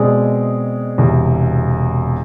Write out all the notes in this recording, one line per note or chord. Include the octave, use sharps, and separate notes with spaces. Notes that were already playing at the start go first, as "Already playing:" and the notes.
Already playing: B2 G#3 C4 G#4 D5
E1 E2 C3